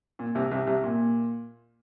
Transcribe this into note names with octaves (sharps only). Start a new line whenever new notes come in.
A#2
C2 C3
C2 C3
C2 C3
A#2